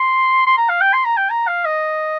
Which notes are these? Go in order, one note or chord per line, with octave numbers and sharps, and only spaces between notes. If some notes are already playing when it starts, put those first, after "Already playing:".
Already playing: C6
C6
A#5
F5
G5
C6
A#5
G5
A#5
F5
D#5